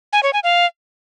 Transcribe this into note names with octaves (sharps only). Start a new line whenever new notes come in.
G#5
C#5
G#5
F5